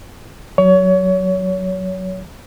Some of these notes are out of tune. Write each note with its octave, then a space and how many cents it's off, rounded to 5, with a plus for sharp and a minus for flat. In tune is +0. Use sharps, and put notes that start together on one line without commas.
F#3 +0 C#5 +25